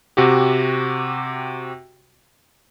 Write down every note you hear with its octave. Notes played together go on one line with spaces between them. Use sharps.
C3 F#4 G4